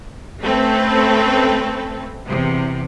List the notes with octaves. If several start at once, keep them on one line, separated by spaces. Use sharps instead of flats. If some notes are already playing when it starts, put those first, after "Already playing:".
A3 C4 C#4 A4 B4
E2 C3